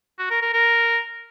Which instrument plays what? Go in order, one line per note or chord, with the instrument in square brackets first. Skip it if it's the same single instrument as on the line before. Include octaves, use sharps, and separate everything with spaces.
[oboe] F#4
A#4
A#4
A#4